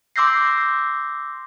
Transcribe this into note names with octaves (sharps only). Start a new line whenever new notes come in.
C6 D6 E6 G6 A#6 C7